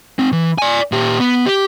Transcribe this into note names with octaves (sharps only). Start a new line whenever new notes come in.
C4 D#4
E3
D5 G#5
A#2 G4
B3
G4